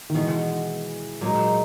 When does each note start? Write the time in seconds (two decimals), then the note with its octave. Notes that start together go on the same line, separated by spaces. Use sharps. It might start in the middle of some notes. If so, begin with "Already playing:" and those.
0.10 D#3
0.15 B2 E3 G#3 B3
1.21 A#2 F#3 G#3 D#4